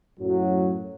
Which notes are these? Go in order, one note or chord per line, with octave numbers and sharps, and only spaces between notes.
F#2 A2 F#3